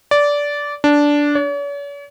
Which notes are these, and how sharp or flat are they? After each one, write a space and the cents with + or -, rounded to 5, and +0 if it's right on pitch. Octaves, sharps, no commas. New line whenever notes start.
D5 -15
D4 -10
C#5 +45